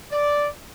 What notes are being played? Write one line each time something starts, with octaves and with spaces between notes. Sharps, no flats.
D5